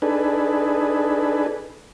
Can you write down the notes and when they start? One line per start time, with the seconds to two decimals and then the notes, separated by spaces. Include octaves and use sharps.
0.02 D4 D#4 G#4 A4 B4